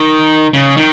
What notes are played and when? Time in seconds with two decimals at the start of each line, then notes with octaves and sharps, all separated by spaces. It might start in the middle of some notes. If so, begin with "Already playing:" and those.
Already playing: D#3
0.53 C#3
0.77 D#3